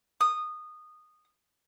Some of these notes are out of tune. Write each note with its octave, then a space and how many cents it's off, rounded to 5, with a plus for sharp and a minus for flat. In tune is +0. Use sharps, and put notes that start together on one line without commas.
D#6 -15